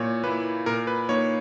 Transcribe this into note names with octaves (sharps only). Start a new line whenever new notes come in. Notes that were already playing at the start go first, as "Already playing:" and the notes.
Already playing: A#2 A#3 E4 C#5
A#3 E4 B4
A#2 A#4
B4
A#3 D#4 C#5